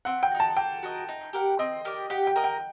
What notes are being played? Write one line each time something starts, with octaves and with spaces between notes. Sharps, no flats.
C4 F#5
G5
D#4 F#4
A5
A#3 G5
F#4 A#4 D#5
D#4
G4 A#4 F#5
C4 D#5
G4 A#4 D5
G4 F#5
G5
A#4 D#5
G5